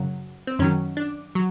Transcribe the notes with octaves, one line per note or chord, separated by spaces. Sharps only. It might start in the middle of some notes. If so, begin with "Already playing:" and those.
Already playing: F#2 C#3 F#3
C4
F#2 D#3 F#3 C#4
D4
F#3